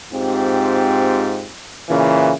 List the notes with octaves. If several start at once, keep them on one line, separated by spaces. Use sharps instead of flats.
G#2 C4 F4 G4
A#2 C#3 E3